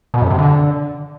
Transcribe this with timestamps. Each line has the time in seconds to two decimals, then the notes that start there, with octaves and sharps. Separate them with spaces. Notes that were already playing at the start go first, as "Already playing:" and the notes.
0.14 B2
0.22 F#2
0.30 C3
0.39 D3